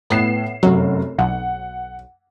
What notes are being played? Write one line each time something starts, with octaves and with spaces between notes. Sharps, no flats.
A2 B3 C7 E7
F1 F#2 F#3
B1 F#5